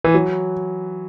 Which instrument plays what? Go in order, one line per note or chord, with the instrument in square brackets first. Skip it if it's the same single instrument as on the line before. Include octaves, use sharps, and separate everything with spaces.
[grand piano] E3
F#3